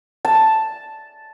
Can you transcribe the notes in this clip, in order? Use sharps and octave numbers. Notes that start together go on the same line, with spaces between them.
A5